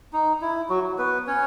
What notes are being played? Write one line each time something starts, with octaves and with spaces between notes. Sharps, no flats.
D#4
E4
F#3 F#4
B3 B4
C#4 C#5